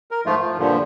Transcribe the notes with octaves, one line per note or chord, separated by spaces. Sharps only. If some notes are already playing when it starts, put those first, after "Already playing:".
A#4
G#2 F3 A3 F4
F3
G2 A#2 D3 F3